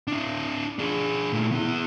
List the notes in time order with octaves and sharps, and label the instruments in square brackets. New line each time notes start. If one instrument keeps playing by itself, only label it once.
[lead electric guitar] D4 E4
D4 G#4
A#2 A3
B3 E4